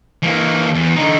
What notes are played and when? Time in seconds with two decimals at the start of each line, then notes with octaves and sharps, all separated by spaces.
0.23 E3 A#3
0.74 E2
0.96 D3 D#4